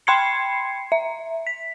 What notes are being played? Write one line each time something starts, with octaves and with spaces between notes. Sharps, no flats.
G5 B5 C6 G#6 C7 C#7
E5
B6